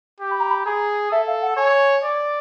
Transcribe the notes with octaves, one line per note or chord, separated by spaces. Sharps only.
G4
B5
A#5
B5
G#4 A#5
A4 E5
F5
F#5
C#5 G#5
D5